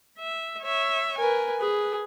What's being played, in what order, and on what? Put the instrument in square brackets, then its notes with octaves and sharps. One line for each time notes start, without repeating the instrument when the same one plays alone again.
[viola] E5
C#5 E5
[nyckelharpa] A#4 B4 [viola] G#5
[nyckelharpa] G#4 [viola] B4